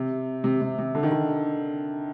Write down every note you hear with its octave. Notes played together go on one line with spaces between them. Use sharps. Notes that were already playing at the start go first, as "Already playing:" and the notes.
Already playing: C3
C3
C3
C3
D3
D#3
D3